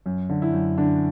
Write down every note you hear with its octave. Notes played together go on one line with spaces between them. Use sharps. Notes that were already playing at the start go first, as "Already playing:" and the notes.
F#2
D3
E4
F#2
D3 D4